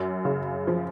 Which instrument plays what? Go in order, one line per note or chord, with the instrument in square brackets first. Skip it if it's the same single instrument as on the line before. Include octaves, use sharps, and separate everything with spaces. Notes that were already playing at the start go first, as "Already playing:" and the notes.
Already playing: [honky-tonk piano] F#2
C#3
F3